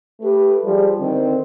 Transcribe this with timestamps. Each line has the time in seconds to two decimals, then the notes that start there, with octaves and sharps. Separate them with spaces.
0.21 A3 G4 B4
0.63 F3 G3 G4 G#4
0.99 D3 D#3 C4